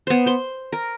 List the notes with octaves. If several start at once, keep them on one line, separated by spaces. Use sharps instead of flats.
B3 C5
C5 C6
A#4